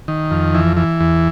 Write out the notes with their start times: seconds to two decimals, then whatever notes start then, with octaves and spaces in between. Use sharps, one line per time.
0.08 D#3
0.31 F2
0.55 E3
0.77 E3
1.01 E2